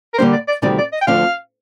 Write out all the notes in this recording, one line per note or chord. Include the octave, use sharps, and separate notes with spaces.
A#4
D3 G3 A#3 D4 C5
D5
D5
D2 C3 D#3 G3 C4 D5
D5
D#5
G5
D2 D3 F3 C4 F5